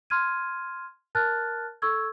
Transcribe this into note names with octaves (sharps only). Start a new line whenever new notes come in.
C6 F6 G#6 D#7
A#4 A5 F6 F#6 A6
A4 C#6 E6 G#6